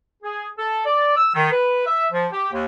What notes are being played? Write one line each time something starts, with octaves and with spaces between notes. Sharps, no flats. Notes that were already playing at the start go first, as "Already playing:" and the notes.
G#4
A4
D5
E6
D#3
B4
E5
F3
G4
D#2